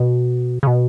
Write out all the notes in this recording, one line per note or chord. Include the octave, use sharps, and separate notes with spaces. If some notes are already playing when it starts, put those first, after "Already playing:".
Already playing: B2
C#3
B2